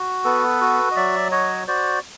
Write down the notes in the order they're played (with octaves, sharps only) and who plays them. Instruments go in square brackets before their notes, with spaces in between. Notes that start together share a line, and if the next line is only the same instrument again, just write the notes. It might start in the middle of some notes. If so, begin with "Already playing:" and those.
Already playing: [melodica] F#4
B3 A4 B4
F#4
D#5
F#3 D5 E5
F#4 C#5 D#5
F#4 C5 D5